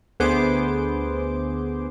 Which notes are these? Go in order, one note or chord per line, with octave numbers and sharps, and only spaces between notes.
D2 B3 G#4 C5 D6